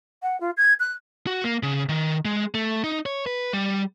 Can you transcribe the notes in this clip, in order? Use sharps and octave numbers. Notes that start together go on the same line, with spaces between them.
F#5
F4
G#6
F#6
F#4
A#3
C#3
D#3
G#3
A3
D#4
C#5
B4
G3